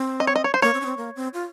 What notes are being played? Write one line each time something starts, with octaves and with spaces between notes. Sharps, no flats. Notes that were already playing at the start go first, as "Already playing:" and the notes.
Already playing: C4
D#5
C#5
D#5
C#5
C5
A#3 C#5
C4
C#4
C4
A#3
C4
F4